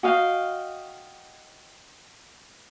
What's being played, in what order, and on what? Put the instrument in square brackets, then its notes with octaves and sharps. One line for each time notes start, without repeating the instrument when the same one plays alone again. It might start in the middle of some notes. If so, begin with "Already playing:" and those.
[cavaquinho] F#4 D#5 F5 G5